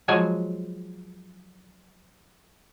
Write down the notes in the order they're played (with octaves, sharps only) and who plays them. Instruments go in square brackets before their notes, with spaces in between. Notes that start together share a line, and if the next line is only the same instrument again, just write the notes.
[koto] F3 F#3 G#3 G#5